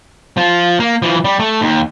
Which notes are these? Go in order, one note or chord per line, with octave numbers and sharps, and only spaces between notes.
F3
A#3
E3 F3
G3
A3
D#2